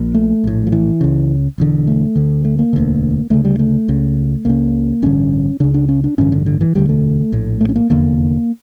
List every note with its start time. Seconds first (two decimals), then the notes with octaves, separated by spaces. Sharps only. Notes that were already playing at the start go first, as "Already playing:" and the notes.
Already playing: A#1 A#2
0.14 A3
0.44 A#1 A2
0.67 F3
0.72 E3
1.01 C#2 C#3
1.58 E1 E2 D3
1.87 A3
2.15 D2 D3
2.45 A3
2.59 A#3
2.73 E1 D2 D3
3.30 D2 C#3 A3
3.45 G3
3.59 A3
3.88 C#2 C#3
4.45 C#2 C#3 A#3
5.02 A1 G2 D3 C#4
5.60 C#2 C#3 D4
5.74 D4
5.89 C#4
6.04 D4
6.18 A1 G2 D3 C#4
6.32 D3
6.46 D3
6.61 E3
6.75 E1 D2 D3 G3
6.89 A3
7.32 A#1 A2
7.61 A3
7.69 C#4
7.76 A#3
7.90 F1 E2 D3 A#3